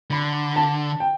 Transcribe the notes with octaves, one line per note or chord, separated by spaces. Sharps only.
D3 B5
A5
G5